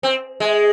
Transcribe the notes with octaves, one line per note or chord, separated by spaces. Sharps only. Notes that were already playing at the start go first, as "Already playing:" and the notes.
C4
G#3